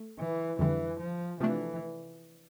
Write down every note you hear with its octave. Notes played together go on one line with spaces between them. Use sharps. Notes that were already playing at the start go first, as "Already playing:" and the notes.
Already playing: A3
E3
F2 D3 E3 G3
F3
C3 E3 F3 A3 D4